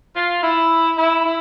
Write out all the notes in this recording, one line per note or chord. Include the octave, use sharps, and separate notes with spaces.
F4
E4
E4
E4